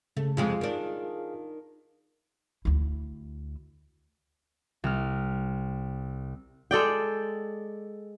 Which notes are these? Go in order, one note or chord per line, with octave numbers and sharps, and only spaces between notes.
C#3 A3
F2 C3 G#3 F4 G#4 F5
D#3 D4
D2 E4
C2 F6
G#3 A4 D5 G5